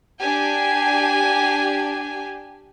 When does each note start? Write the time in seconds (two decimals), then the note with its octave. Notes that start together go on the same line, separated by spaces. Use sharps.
0.19 D4 G4 G#5